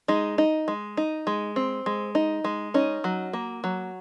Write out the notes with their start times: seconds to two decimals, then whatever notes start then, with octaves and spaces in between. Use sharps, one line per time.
0.08 G#3 D#4
0.38 D#4
0.68 G#3
0.97 D#4
1.27 G#3
1.56 C4
1.86 G#3
2.15 D#4
2.44 G#3
2.74 C#4 D#4
3.04 F#3
3.33 A#3
3.64 F#3